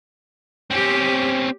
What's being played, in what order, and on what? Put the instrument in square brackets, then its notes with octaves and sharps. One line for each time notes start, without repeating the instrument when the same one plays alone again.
[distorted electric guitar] C4 C#4 [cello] G4